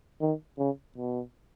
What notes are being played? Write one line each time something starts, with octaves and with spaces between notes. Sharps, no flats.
D#3
C#3
B2